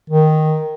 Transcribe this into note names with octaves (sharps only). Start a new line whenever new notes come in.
D#3